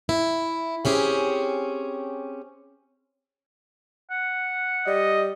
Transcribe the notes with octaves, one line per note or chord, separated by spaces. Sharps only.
E4
C4 C#4 G4 G#4
F#5
G3 D#5